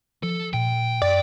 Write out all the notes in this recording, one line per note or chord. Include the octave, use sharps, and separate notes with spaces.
F3 A4
A#2 G5
F#2 D5